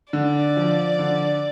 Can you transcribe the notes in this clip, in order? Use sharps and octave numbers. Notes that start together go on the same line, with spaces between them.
D3 D5
F3
D3